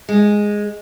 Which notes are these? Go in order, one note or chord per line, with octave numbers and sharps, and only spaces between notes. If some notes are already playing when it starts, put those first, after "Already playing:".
G#3